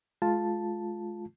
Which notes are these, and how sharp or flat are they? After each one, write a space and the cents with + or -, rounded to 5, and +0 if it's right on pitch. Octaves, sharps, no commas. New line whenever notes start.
G#3 +35 F4 +0 A5 +0